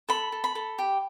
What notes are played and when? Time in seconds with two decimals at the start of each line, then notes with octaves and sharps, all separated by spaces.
0.09 A4 B5
0.32 A4
0.44 B5
0.55 A4
0.79 G4